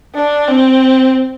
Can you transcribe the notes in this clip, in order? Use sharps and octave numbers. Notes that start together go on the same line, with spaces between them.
D4
C4